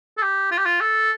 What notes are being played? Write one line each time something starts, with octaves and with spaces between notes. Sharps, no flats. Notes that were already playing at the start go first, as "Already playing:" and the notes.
A4
G4
F4
G4
F4
A4